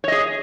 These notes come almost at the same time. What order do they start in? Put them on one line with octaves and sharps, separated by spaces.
C#5 D#5 G#4